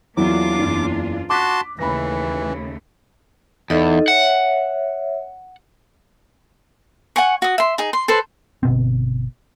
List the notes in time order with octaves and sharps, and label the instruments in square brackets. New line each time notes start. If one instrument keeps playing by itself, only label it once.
[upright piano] E2 F#3 E4 [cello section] A#3 D4 F4 [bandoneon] D6
[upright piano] F#1 E2
[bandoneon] F#4 A5 C6 [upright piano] D6 F#6 B6
[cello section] D#2 C#3 A3 [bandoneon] E3 [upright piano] B5 A#6
[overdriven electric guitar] E2 [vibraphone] D#4 A4 D#5
[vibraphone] C#5 E5 [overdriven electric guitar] F#5
[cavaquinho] F#5 G#5 C#6
F#4 D#6
E5 C6
D#4 G#4
C6
A4 B4 C5
[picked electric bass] G1 B2 C4